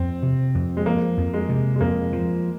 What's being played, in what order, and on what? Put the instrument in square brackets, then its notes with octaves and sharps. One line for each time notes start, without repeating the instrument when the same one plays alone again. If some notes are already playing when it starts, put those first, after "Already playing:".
Already playing: [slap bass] F2 [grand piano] C4
[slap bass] C3
F2
[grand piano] G#3
[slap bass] F3 [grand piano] A#3
[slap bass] F2
[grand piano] G#3
[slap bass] C3
[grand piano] G#3
[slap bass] F2 [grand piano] A#3
[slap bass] F3